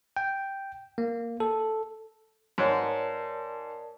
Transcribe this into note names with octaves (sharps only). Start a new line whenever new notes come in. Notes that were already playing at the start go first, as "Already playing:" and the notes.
G5
A#3
A4
G#2 F#4 A#4 B4 C#5 D5 A5